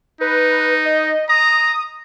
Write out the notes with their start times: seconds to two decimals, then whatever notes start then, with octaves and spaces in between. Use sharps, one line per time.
0.21 D#4 B4
0.85 D#5
1.29 A#5 D#6